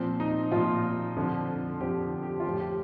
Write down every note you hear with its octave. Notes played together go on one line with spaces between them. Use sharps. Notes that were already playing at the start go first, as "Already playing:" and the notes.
Already playing: A#2 F3 C4
D#4
A#2 F3 F4
F2 D3 F3
F2 D3 F3 G4
G4
F4
A2 F3 G4
G4